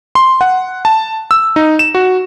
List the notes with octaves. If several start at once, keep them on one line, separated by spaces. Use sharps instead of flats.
C6
F#5
A5
E6
D#4
E7
F#4